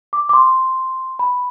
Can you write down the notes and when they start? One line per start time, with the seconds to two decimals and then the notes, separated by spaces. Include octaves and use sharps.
0.13 D6
0.29 D6
0.33 C6
1.19 B5